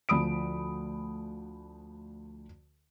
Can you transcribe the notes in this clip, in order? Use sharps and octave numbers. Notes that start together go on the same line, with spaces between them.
D2 F3 B5 D#6 D7